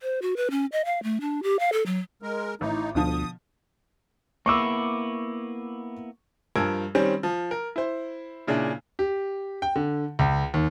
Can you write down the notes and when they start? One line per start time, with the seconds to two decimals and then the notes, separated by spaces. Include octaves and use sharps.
0.01 C5
0.22 F#4
0.37 B4
0.51 C#4
0.72 D#5
0.85 F5
1.03 A3
1.21 D4
1.43 G4
1.59 F5
1.73 A4
1.86 F#3
2.22 G#3 A#4
2.61 A1 D#4 E4
2.95 D2 B2 D3 F3 D#6
4.46 A#3 B3 E4 C#6 D6 E6
6.56 G2 F3 A#4 E6 G#6
6.95 D#3 G3 C4 C#4
7.23 F3
7.51 A#4
7.76 E4 C5
8.47 A#2 C#3 D4 E4
8.99 G4
9.62 G5
9.76 D3
10.19 C#2
10.54 D#2